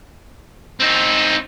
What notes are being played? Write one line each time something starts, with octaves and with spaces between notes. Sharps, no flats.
C4 D#4